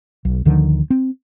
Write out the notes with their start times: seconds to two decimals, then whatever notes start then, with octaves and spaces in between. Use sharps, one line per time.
0.25 B1
0.45 D2 D3 D#3 F3
0.90 C4